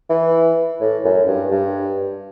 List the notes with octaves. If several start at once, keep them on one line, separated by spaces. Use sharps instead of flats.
E3
A2
F#2
G2
G2